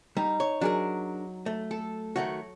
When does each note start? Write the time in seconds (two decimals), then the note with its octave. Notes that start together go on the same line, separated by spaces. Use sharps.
0.17 G3 D#4
0.40 C#5
0.61 F#3 D4 G#4 A#4
1.46 A3
1.71 A4
2.16 D#3 A3 F#4 C#5